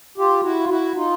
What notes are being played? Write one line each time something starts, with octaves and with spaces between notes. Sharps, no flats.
F4 G4
E4 F#4
F4
E4 F#4
D#4 F4